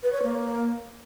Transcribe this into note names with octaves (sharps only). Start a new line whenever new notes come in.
B4
C#5
A#3